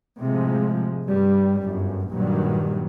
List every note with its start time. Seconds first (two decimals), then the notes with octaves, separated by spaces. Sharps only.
0.20 A2 C3 F3 G#3
1.06 G2 G3
1.64 G1 F#2
2.10 A#1 G2 A#2 D#3 F#3 G3